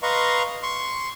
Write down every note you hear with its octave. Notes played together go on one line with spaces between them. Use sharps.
B4 D#5 F5 A#5 C6 C#6
C6 C#6